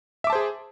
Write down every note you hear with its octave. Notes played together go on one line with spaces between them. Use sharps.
G#4 C5 E5 A5 D6